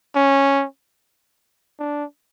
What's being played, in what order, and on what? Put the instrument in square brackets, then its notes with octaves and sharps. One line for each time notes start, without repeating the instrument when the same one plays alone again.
[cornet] C#4
D4